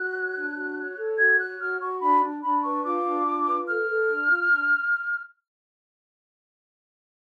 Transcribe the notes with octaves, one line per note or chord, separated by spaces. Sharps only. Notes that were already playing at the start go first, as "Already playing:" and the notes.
Already playing: F#4 F#6
C#5
D4
F#4
C#5
A4
F#4 G#6
C#5 F#6
F#4 F6
F#4 C#6
D4 B5
D4
D4 B5
B4 C#6
F4 D6
D4
F4
B4
A4 F6
A4
D4
F4
D4